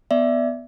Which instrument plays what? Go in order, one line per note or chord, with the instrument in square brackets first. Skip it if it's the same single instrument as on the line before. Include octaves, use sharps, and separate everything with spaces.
[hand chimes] B3 D5 E5